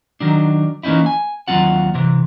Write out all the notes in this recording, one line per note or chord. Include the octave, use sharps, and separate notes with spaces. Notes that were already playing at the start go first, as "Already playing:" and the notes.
D#3 F#3 D4
E3 A#3 C#4 D#4 E4
G#5
D#2 C3 F#3 C4 F4 F#5
C3 E3